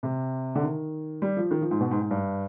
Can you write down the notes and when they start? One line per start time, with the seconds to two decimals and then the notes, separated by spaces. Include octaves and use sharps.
0.03 C3
0.55 D3
0.63 D#3
1.22 G3
1.37 F3
1.51 D#3
1.61 F3
1.71 G#2
1.80 B2
1.91 G#2
2.01 G#2
2.11 G2